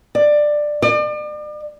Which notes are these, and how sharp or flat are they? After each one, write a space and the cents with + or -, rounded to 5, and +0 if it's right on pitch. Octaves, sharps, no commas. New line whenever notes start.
D5 +15
D5 +40